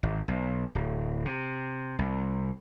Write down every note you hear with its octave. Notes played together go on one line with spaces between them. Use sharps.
G#1
B1
D1
C3
C2